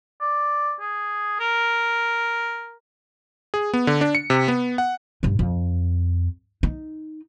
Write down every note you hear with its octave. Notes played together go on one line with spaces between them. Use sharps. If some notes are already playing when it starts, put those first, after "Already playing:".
D5
G#4
A#4
G#4
B3
D3
D4
C#7
C3
B3
F#5
G2 D#4
F2
D#4